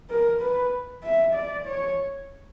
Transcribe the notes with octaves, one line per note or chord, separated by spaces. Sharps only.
A#4
B4
E5
D5
C#5